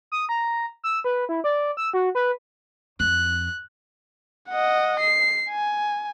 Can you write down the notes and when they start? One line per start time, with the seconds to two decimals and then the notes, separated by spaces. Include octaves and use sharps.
0.12 D#6
0.29 A#5
0.84 E6
1.04 B4
1.29 E4
1.44 D5
1.77 E6
1.93 F#4
2.15 B4
3.00 F2 F#6
4.50 D#5 F#5
5.00 C7
5.50 G#5